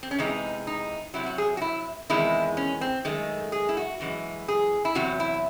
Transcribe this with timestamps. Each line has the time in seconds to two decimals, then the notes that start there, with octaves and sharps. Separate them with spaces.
0.03 C4
0.11 C#4
0.19 E2 C3 E3 G#3 D#4
0.67 D#4
1.14 C3 F#3 E4
1.26 F#4
1.38 G#4
1.57 F#4
1.61 E4
2.10 E2 C3 D#3 G#3 E4
2.57 C#4
2.81 C4
3.05 F#2 D#3 G#3 A3
3.52 G#4
3.69 E4
3.77 F#4
4.00 F#2 E3 G#3 F#4
4.48 G#4
4.85 E4
4.95 E2 C3 F#3 F#4
5.20 E4